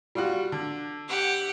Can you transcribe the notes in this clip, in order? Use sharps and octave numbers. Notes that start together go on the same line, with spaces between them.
G3 F4 F#4
D3
G4 F#5